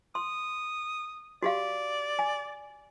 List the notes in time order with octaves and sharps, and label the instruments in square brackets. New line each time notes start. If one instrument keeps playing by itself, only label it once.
[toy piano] C6 [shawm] D#6
[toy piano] F#4 G4 F5 [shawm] D5
[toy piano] G#5